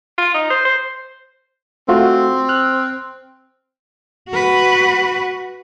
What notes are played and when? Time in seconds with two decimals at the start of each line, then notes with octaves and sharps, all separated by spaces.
0.18 F4
0.34 D#4
0.50 C5
0.65 C5
1.89 A3 C4 F4 F#4
2.49 F6 F#6
4.30 F#4 B4